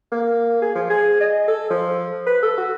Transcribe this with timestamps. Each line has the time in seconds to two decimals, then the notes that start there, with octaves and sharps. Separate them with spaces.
0.12 A#3
0.62 G#4
0.76 F3
0.90 G#4
1.21 D#5
1.48 A4
1.70 F3
2.27 B4
2.43 A4
2.58 F#4